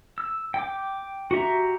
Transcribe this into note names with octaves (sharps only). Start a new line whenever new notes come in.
E6
G5 D6
F#4 G4 E5 A#5